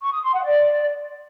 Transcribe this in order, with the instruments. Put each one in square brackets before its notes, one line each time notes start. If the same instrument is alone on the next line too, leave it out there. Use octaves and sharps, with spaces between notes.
[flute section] C#6
D#6
C6
F#5
D5